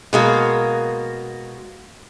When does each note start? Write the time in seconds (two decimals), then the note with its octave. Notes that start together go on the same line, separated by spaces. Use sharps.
0.13 B2 G#3 A#3 F#4